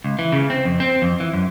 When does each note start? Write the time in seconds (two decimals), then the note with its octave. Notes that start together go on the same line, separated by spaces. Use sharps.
0.04 C#2
0.19 E3
0.32 C#3
0.50 C4
0.65 F2
0.80 C4
1.02 F2
1.20 E3
1.34 F#2